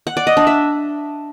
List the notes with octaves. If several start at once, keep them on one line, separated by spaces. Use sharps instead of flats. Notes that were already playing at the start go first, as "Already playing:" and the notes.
F#5
D5
D#5
D4
E5